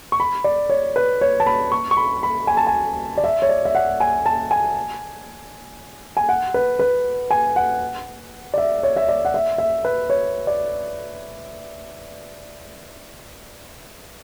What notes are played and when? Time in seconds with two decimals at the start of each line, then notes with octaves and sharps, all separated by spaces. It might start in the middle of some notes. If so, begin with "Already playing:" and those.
0.12 C#6
0.20 B5
0.44 D5
0.70 C#5
0.96 B4
1.21 C#5
1.40 A5
1.46 B5
1.72 C#6
1.91 C#6
1.97 B5
2.23 B5
2.47 G#5
2.57 A5
2.67 G#5
3.18 D5
3.24 E5
3.42 C#5
3.49 D5
3.65 E5
3.75 F#5
4.00 G#5
4.26 A5
4.51 G#5
6.17 G#5
6.29 F#5
6.54 B4
6.79 B4
7.31 G#5
7.56 F#5
8.54 D5
8.58 E5
8.83 C#5
8.96 E5
9.09 D5
9.25 F#5
9.34 E5
9.58 E5
9.85 B4
10.10 C#5
10.47 D5